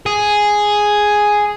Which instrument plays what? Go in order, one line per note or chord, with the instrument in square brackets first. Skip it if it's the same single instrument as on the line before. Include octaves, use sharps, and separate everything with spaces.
[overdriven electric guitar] G#4